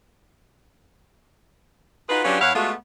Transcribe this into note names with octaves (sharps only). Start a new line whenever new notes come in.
D#4 F4 F#4 G#4 B4
F#3 C#4 D4 F4 G4 B4
E2 E4 C#5 F5 F#5
G#3 A3 B3 F4 F#4 A4